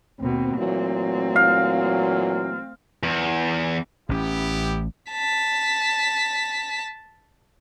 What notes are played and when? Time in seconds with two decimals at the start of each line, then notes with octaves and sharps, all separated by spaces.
0.20 D#2 B2 C4
0.57 A#2 E3 F#3 A3 C4
1.36 F5
3.03 E2
4.09 A1 B3 C#4 E4 G4
5.11 A5 B6